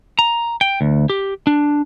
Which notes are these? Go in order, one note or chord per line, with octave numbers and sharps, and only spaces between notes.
A#5
G5
D2
G4
D4